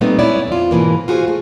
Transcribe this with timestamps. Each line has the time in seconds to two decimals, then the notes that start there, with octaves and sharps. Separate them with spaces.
0.01 A#2 G3 A3 B3 C4 D#4
0.19 G#3 B3 C#4 E4 C#5 D5
0.47 F2 F4
0.71 G#2 B2 E3 A#3
1.08 F4 F#4 G#4 A#4 C5
1.28 A3